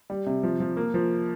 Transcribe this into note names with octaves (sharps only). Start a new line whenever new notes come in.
G3
C3
F3
F3
A#3
F3